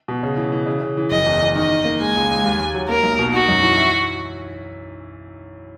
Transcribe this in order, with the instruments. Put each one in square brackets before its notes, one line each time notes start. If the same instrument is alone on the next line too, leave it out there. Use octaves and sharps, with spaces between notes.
[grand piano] B2
C#3
E3
E3
C#3
C#3
E3
[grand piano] F#1 [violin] D#5
[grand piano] E2
E2
[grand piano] D#3 [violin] D#5
[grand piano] D#3
A#3
[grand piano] G#3 [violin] G#5
[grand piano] C#2
C#2
D#2
D#2
F#3
[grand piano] A#3 [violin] A#4
[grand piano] B1
B2
[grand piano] D#4 [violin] F#4
[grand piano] F#2
E3
E4